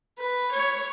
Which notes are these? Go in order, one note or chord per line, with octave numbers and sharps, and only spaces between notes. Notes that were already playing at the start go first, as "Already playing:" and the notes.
B4
C#5